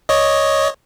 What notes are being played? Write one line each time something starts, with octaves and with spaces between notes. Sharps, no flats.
C#5 D#5